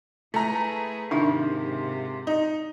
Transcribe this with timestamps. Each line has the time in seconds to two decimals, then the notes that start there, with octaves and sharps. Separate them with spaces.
0.34 A3 E4 G#4 B4 A#5
1.11 G#2 C3 D#3 D4 E4 F4 E5
2.27 D#4